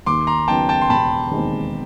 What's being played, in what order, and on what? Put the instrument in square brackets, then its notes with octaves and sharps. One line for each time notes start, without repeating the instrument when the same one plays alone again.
[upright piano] D#2 [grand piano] C6 D6
[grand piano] A#5 C6
[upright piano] C#3 F#3 B3 D#4 [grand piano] G5 A5
[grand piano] G5 A5
C6
[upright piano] E1 [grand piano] A5 B5
[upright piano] D#2 D#3 G#3 C4